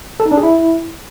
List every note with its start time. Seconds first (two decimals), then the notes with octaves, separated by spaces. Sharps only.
0.20 A4
0.26 D#4
0.31 D4
0.37 G#4
0.43 E4